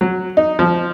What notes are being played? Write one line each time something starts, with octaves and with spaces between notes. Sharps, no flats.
F#3
D#4
F3